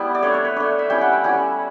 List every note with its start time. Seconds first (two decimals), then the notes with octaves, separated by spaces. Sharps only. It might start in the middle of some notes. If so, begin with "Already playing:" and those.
Already playing: G3 B3 E4
0.15 D5
0.22 A3 D4 C#5
0.34 C#5
0.45 B4
0.56 A3 D4 C#5
0.79 E5
0.90 G3 C#4 E4 G5
1.01 F#5
1.13 G5
1.24 G3 C#4 E4 F#5